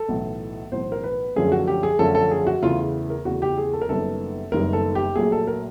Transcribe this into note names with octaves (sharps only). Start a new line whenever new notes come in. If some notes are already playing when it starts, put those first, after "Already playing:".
Already playing: A4
B1 A2 E3
B1 A2 E3 C5
A#4
B4
F#2 D3 F3 A3 C#4 G#4
F#4
G4
G#4
F#2 D3 F3 A3 C#4 A4
A4
G#4
F#4
E2 C#3 E3 A3 F4
A#4
E2 C#3 E3 A3 F#4
G4
G#4
A4
A#4
F#1 F#2 D#3 G3 B3 A4
F#1 F#2 D#3 G3 B3 A#4
A4
G4
A#1 A#2 F#3 A3 G#4
A4
A#4